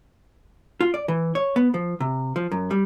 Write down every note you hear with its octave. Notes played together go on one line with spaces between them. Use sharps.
F4
D5
E3
C#5
B3
F3
C3
F3
F#2
G3